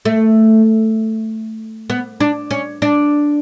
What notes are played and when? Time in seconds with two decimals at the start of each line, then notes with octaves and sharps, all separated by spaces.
0.05 A3
1.90 B3
2.20 D4
2.51 C#4
2.82 D4